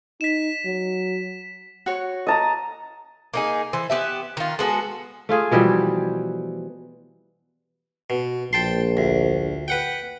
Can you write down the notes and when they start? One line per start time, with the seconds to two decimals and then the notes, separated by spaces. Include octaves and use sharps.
0.21 D#4 B6 E7
0.65 F#3
1.86 F#4 C#5
2.27 D#5 A5 A#5
3.34 A#3 D#4 G#4
3.73 E3 C5
3.90 B3 G4 E5
4.37 D#3 F4
4.59 G#3 B3 F#4 A4
5.29 A3 F4 G#4
5.51 B2 E3 F3 G3
8.10 B2
8.53 A#1 G5 A5 C6
8.97 D2
9.68 B4 F#5 G5